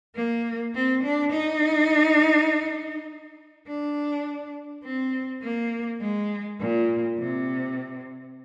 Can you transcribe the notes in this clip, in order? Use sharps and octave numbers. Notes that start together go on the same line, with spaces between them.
A#3
C4
D4
D#4
D4
C4
A#3
G#3
A#2
C3